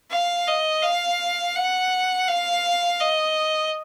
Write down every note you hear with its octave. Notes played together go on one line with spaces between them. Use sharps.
F5
D#5
F5
F#5
F5
D#5